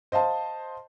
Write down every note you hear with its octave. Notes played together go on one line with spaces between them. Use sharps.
C5 D#5 F5 A5